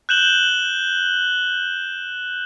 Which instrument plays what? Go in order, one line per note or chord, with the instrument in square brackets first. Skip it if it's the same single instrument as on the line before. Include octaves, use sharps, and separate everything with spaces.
[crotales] F#6 G6 E7 F#7 G7